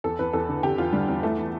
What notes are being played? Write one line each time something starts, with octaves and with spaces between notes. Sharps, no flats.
E2 A4
E2 B4
E2 A4
D3
D3 G4
E2 F4
D3 G3
E2
E3 A3
E3